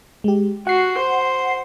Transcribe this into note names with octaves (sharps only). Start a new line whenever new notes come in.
G#3 G4
F#4 F#5 C7
C5